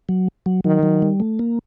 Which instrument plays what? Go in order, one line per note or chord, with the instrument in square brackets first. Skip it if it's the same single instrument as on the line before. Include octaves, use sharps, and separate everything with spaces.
[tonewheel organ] F#3
F#3
[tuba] D#3 [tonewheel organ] F#3
[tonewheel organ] F#3
G3
A3
A#3